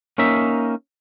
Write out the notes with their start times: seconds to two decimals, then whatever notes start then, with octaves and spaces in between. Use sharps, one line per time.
0.18 A#3 C#4 D#4 E5